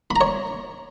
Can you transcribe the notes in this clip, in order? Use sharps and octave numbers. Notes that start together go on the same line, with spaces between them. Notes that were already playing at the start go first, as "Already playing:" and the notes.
B5
A#5
C#5